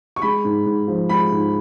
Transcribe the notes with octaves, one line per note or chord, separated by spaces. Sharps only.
C#6
G#3 B5
G#2
G#2
F3
G#3 B5
G#2